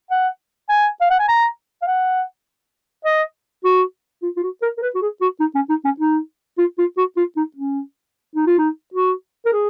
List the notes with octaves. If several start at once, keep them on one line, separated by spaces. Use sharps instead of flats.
F#5
G#5
F5
F#5
G#5
A#5
F5
F#5
D#5
F#4
F4
F4
F#4
A#4
A#4
B4
F#4
G#4
F#4
D#4
C#4
D#4
C#4
D#4
F4
F4
F#4
F4
D#4
C#4
D#4
F4
D#4
F#4
A#4
G#4